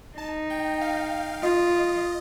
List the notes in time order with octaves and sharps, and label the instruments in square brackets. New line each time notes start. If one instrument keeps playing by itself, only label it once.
[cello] D#4 [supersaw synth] A5
[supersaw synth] G5
F5
[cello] F4 [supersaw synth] D#5